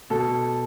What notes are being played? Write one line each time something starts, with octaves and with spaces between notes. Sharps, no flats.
B2 A4